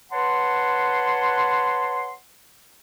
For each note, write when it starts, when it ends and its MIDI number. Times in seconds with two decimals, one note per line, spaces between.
0.12 2.13 71
0.12 2.13 73
0.12 2.13 78
0.12 2.13 81
0.12 2.13 84